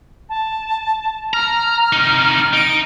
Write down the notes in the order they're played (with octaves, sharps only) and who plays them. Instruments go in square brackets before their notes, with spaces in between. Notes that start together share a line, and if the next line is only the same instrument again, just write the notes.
[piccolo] A5
[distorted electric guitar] A#5 [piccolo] F6
[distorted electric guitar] C3 D#4
[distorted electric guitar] D#4 [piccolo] D7